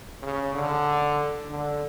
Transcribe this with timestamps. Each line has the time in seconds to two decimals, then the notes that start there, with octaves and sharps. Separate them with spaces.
0.23 C#3
0.54 D3
1.50 D3